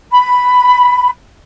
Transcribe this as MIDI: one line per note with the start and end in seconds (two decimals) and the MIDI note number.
0.13 1.10 83